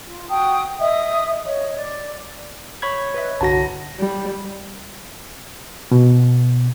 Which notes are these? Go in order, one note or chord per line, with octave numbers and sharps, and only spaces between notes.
F4
F#4 G5 A5 D#6
D#5 E5 D#6
C#5 D#5
D5
C#5 B5 G#6
B4 D#5 E5
C2 G2 D3 F#4 A5 A#5 A#6
G3
B2